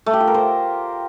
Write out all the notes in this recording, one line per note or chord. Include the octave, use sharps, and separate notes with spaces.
A3
G4
F4
A#4
C5